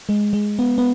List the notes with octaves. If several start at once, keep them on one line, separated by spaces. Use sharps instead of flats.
G#3
G#3
B3
B3